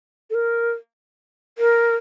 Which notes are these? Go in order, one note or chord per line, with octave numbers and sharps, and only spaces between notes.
A4
A#4
A#4